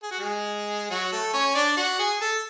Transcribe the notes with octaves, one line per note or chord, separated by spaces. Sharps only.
G#4
F#4
G#3 G#4
F#3 F#4
A3 A4
C#4 C#5
D4 D5
F#4 F#5
G#4 G#5
A4 A5